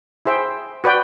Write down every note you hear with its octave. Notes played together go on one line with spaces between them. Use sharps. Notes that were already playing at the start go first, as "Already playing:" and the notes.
E4 G#4 C5 E5 G5
F#4 B4 D5 G5